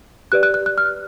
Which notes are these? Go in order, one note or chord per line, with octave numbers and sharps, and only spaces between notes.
G4 B4 D5 F#6
F#6
F#6
F#6
F6